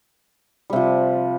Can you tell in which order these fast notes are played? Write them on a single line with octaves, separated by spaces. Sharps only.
G3 C3 F3